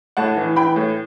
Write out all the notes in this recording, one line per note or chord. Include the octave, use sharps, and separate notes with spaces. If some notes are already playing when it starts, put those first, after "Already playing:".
A2 F#5 A5
E3
E3 G5 B5
A2